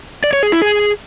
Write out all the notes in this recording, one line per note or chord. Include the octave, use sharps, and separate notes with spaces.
D5
C#5
G#4
E4
G#4